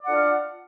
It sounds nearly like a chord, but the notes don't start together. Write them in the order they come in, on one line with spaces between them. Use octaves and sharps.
D5 F#5 D4 F4 F5